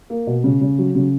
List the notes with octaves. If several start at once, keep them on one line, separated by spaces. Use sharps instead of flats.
A#3
B2
C#3
C#3
F#3
C#3